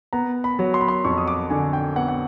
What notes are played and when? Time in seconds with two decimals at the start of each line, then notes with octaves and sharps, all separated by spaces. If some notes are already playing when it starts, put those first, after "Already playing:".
0.13 B3 A#5
0.44 B5
0.59 F#3
0.74 C6
0.81 B5
0.88 C6
1.05 F2 C#6
1.18 D#6
1.27 D6
1.50 D3 G#5
1.73 G5
1.96 B3 F#5
2.08 F#5